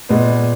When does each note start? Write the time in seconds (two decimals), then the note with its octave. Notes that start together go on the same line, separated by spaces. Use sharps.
0.09 A#2 G#3 B3